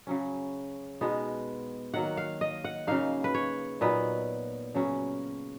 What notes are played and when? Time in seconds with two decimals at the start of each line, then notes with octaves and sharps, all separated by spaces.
0.07 C#3 F#3 C#4
1.01 B2 G#3 B3 D#4
1.94 D#3 F#3 A#3 F#5
2.17 F5
2.41 D#5
2.64 F#5
2.87 C#3 F#3 A#3 D#4 F5
3.24 B4
3.34 C#5
3.81 A#2 F#3 B3 D#4 B4
4.75 C#3 F#3 C#4